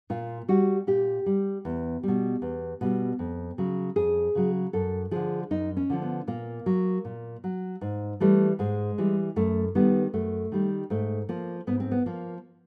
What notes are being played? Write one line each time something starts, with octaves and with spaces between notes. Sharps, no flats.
A#2 F4
G3 F#4
A#2 G4
G3
E2
B2 G3
E2
B2 G3
F2
C#3 F#3
F2 G#4
C#3 F#3
F#2 A4
D3 F3 G#4
F#2 D#4
C#4
D3 F3
B3
A#2 A#3
F#3
A#2
F#3
G#2
E3 G3 A3
G#2 G#3
E3 G3
F#2 A3
D#3 G3 B3
F#2 A3
D#3 G3
G#2 A3
F3 A#3
G#2 B3
C4
B3
F3 A#3